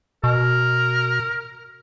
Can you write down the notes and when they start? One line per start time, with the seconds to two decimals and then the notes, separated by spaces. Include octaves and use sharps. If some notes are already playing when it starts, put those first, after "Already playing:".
0.24 B2 A#4